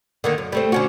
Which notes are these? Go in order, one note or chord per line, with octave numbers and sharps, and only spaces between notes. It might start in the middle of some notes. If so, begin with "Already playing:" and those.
D3 D#3 A#3
F#2
G3 A3 C4
D3 C#4 F#4